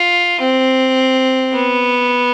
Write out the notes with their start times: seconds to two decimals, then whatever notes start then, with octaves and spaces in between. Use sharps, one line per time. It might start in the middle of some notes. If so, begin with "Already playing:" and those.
Already playing: F4
0.40 C4
1.53 B3